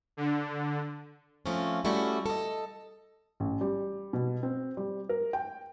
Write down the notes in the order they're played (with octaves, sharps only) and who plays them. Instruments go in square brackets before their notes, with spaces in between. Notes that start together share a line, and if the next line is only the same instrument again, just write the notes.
[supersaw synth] D3
[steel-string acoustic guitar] F3 A3 A#3 C4 C#4
G3 A3 C#4 E4 F#4
A4 D#5
[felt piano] A1
G3
B2
C4
G3
A#4
G5